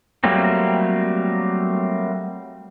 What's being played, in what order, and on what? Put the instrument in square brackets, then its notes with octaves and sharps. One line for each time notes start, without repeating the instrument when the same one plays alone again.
[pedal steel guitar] F#3 G3 A3 A#3 C4